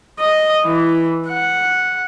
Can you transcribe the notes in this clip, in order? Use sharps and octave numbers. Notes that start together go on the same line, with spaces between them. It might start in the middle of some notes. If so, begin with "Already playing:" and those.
D#5
E3
F#5